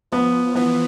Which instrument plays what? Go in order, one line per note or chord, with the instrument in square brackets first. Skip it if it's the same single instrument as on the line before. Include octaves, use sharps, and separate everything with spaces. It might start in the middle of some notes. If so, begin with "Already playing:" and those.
[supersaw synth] F3 [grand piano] B3
[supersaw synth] E3 [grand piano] B3